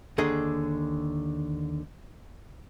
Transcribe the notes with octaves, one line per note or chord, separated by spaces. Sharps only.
D#2 D3 G#4 D#5